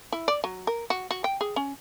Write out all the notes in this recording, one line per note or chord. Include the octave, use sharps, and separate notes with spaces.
E4
D5
F#3
A#4
F#4
F#4
G5
G#4
C#4